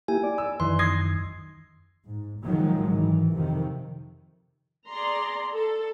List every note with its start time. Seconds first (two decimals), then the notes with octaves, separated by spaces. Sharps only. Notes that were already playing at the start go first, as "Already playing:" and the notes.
0.08 A#3 E4 G4 G#5
0.23 D5
0.38 E6
0.60 F#2 D#3 E3 C6
0.79 D#6 G#6 A#6 C7
2.08 G#2
2.43 A#2 D#3 F3 F#3 G#3
2.87 G#1 D#3 E3
3.34 F2 C3 D#3
4.87 G#4 D5 A#5 C6
5.53 A4